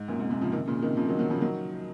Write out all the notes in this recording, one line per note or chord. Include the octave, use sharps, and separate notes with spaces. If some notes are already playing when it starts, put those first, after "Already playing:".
Already playing: G#2
F#2 A#2
G#2 C3
G#2 C3
C#3 F3
C3 D#3
A#2 C#3
C3 D#3
C#3 F3
D#3 F#3
D#3 F#3
C#3 F3
D#3 F#3